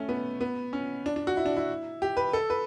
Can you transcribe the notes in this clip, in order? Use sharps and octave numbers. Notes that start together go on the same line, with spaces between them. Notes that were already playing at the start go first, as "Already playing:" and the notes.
Already playing: A3 C#4
B3
B3
C#4
D4
D4
F#4
E4
D4
E4
G4
B4
A4
B4